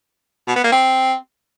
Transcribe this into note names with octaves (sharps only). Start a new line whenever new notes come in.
B2
B3
A#3
C4